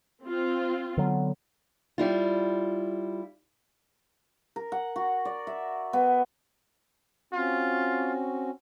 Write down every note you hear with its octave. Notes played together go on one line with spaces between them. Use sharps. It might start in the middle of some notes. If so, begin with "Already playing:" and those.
C4 F4
D3 F#3 B3
G3 E4 F4
A#4
F#5
F#4
D5
E5
B3
C4 C#4 F4 F#4